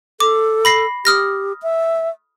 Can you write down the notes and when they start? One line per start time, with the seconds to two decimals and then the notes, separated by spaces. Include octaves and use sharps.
0.20 A4 D6
0.65 B5 A#6 C7
1.05 G4 D#6 F6 A#6
1.63 E5